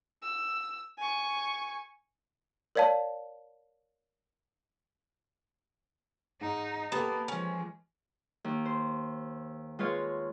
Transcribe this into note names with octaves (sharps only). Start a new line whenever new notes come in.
E6
G#5 C#6
A#4 C#5 D5 F5 A5
G#2 D#4
A#3 B3 G4 A4 B4 A5
F3 G#3 C#4
D#2
C5
G#3 F4 B4 C#5 F5